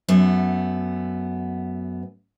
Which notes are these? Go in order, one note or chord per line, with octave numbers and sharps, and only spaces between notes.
F#2 A3 B3